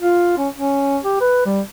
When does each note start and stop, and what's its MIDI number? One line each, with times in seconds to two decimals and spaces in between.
0.01 0.37 65
0.38 0.49 61
0.56 0.98 61
1.04 1.16 67
1.21 1.43 71
1.46 1.61 55